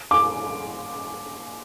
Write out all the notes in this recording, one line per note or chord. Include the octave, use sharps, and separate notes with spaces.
D6